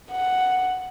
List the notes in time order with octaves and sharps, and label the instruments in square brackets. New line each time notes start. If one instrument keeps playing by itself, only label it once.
[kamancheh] F#5